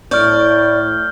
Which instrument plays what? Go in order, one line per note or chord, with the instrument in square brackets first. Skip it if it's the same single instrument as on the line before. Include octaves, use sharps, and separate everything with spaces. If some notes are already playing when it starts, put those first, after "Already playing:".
[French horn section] A2 [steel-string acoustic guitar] C#5 D5 [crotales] F6 G6